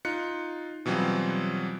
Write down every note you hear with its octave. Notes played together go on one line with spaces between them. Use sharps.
D#4 F4 F#6 C#7
B2 E3 F#3 G3 C4 F4